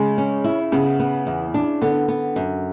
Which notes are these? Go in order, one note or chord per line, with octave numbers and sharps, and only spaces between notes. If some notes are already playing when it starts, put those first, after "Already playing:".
Already playing: C#3 G#3
C#4
E4
C#3 B3
B3
E2
D4
D3 B3
B3
F#2